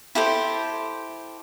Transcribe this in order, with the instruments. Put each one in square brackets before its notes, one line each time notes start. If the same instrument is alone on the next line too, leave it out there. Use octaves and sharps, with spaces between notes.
[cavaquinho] E4 G4 A4 C5